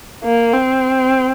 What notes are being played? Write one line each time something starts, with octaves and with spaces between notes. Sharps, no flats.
A#3
C4